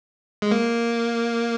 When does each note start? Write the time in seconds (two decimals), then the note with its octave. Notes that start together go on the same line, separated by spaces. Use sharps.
0.42 G#3
0.51 A#3